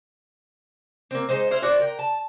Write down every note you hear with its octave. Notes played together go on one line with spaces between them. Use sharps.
A#3 C4
G#3 D#4 C5
E4 C5 F5
F#4 C5 D5 F#5
A#4 G5
A5